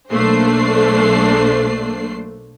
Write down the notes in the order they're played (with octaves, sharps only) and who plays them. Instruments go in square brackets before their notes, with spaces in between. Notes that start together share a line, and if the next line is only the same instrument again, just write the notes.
[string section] B1 A3 A#3 D4 C5 C7